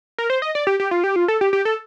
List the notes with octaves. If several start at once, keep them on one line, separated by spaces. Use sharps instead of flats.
A#4
C5
D#5
D5
G4
G4
F4
G4
F4
A4
G4
G4
A4